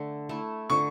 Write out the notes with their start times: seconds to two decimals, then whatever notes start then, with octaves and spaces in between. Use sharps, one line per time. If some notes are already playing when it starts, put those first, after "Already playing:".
Already playing: D3 A3
0.29 A3 E4
0.70 D3 C#6